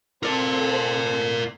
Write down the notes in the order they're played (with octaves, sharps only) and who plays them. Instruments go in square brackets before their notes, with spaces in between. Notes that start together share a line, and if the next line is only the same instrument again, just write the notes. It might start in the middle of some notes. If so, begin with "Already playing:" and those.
[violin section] C4 A4 C5 [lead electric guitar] A#4 D5